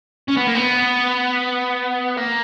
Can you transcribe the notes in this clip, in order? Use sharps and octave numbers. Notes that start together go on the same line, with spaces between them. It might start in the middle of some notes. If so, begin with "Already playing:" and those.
C#4
B3
A#3
B3
A#3